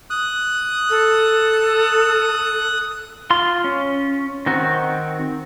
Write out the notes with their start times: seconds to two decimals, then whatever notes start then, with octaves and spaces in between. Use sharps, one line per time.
0.10 D#6 F#6
0.90 A4
3.30 F4 C6
3.64 C#4
4.46 D#3 C4 F#4